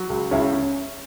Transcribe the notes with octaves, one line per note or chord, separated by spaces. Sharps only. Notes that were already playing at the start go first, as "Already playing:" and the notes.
Already playing: F#3
C#2
C#2 C#4 E4
C#4